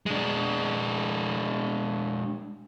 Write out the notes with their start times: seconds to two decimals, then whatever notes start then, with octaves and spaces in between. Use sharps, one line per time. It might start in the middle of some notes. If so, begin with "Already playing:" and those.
0.06 G#3 D4